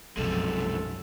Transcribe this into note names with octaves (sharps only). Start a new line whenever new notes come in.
B1 F#2 C3 F3 G#3 A4